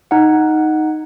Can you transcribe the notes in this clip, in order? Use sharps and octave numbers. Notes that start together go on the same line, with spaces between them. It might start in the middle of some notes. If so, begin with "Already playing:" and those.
D#4 F#5